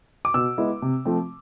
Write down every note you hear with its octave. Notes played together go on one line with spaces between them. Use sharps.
D6
B2 E6
G#3 B3 E4
C3
F3 A3 C4